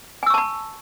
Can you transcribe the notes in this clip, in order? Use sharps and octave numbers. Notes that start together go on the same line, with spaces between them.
G#5 A5 B5 C#6 E6